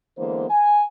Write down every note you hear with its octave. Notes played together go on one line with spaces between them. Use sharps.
D3 E3 G#3 A#3 B3 C5
G#5